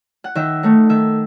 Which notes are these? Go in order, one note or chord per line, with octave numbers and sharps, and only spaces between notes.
F#5
D#3 E5
A3 D#4
D#3 E5